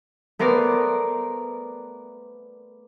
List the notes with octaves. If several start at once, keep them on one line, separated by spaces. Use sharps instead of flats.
A3 B3 A#4 C5 D5